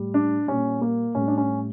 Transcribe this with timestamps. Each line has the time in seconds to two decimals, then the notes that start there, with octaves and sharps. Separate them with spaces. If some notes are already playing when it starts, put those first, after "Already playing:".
Already playing: A2 G3
0.14 D4
0.47 A#2 G3 C#4
0.82 A#3
1.15 A2 G3 C#4
1.28 D4
1.38 C#4